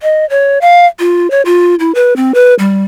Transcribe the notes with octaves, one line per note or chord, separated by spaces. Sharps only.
D#5
C#5
F5
F4
C#5
F4
E4
B4
C4
B4
G3